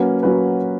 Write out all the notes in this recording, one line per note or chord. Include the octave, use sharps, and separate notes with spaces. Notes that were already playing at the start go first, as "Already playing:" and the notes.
Already playing: F#3 A#3 C#4 F#4 B4
F#3 A#3 C#4 F#4 B4